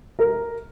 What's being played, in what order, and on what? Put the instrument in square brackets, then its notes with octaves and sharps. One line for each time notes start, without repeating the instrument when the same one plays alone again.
[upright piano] A#4